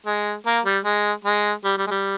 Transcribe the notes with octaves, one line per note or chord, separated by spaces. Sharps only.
G#3
A#3
G3
G#3
G#3
G3
G3
G#3
G3